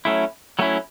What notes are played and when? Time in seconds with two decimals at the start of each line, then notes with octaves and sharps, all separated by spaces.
0.05 F#3 A3 C#4 E4
0.59 F#3 A3 C#4 E4